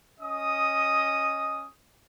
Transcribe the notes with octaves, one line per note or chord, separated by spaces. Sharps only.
C#4 D#5 D#6